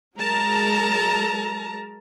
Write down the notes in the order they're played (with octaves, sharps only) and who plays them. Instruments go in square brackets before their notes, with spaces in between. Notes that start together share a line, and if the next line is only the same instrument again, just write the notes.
[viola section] F#3 G#3 A#4 A5 A#5